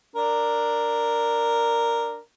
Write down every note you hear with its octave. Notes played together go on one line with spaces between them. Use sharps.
D4 A#4